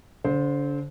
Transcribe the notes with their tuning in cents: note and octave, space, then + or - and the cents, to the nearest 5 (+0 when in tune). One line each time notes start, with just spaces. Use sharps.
D3 -35 C5 +0